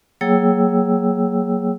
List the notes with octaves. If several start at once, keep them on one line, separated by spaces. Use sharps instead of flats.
F#3 A#3 G#4 C#5 G5 E6